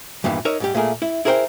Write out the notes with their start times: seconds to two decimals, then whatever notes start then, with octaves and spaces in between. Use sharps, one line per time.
0.24 E2 G2 A#2 D#3 E3
0.45 D#4 A#4 C#5 E5
0.60 G#2 G3 G4
0.74 A#2 A3 G#4 A#4
1.02 E4
1.25 E4 G#4 A#4 C5 D#5 G5